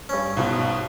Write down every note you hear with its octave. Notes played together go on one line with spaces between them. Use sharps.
G2 C#4
B1 G#2 B2